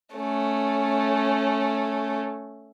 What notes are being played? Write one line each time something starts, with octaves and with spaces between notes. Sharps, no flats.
A3 C#4